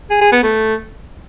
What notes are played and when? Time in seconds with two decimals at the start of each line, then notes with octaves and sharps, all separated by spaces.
0.10 G#4
0.21 G#4
0.32 B3
0.43 A3